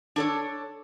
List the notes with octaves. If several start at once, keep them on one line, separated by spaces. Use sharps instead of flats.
D4 A4 C#5